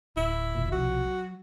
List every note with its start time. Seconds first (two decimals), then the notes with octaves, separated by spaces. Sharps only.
0.17 D1 E4
0.55 E1 D#2 A#2
0.72 B1 C3 F3 F#4
1.05 F#3